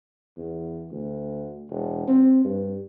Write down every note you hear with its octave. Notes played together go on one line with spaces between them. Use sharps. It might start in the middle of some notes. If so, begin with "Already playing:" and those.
E2
D2
E1
C4
G2